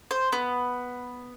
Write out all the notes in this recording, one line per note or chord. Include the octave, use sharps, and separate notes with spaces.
C5
B3